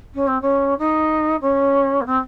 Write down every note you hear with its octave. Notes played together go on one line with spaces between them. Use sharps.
C#4
C4
C#4
D#4
C#4
A#3
C4